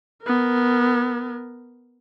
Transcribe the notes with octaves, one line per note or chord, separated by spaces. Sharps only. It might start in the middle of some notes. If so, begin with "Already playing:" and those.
B3 A#4